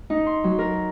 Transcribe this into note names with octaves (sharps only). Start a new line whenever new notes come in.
D#4
C6
F#3
A#4